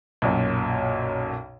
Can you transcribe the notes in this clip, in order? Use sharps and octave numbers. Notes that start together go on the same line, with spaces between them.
B1 F#2 A#2